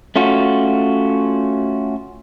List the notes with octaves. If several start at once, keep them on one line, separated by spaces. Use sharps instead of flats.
A3 C#4 F4 F#4